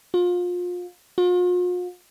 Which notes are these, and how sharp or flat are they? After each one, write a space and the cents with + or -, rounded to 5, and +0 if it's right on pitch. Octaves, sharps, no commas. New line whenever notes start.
F4 +30
F4 +45